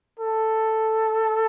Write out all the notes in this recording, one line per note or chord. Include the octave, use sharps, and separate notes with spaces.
A4